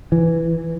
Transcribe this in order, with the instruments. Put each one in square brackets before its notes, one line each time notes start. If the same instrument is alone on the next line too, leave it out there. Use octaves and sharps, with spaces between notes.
[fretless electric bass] E3